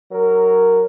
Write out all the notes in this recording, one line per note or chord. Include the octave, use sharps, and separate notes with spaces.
F#3 A#4